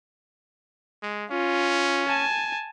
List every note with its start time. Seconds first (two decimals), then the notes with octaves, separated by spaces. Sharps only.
1.02 G#3
1.31 C#4 F4
2.07 G#5 A5